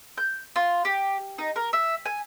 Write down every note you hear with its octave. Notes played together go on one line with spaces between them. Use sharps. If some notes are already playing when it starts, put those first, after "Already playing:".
G6
F4
G4
D#4
A#4
E5
G#5